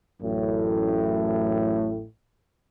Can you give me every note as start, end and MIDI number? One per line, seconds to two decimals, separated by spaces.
0.21 2.04 33
0.21 2.04 42
0.21 2.04 45